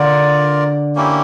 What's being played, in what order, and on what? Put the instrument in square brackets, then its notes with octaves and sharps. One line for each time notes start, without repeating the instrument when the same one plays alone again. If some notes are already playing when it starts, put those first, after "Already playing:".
Already playing: [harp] D3 [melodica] F4 A#4 D5
[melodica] A#3 C#4 E4 G4